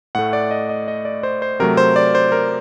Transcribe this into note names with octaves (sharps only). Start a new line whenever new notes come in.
A2 A3 F#5
D5
D#5
D#5
D#5
D5
C5
C5
C3 F#3 A3 A#4
C5
D5
C5
A#4